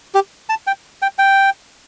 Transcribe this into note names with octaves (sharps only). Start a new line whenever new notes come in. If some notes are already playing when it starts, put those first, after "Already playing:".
G4
A5
G5
G5
G5